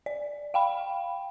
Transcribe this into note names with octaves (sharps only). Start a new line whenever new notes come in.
D5
F5 G5 B5